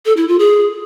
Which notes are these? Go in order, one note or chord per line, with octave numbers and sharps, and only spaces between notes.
A4
E4
F4
G#4